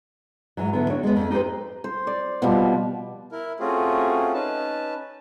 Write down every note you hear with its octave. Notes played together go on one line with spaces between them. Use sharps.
G#2 E3 F#3
D3 B3 E4
D4 F#4 C#5
G#3 B3
F2
D#4 G4 G#4 B4 C5
C5
D5
B2 F3 G3
E4 A#4
A3 C4 C#4 F4 F#4 G#4
C#4 D#4 B4 A5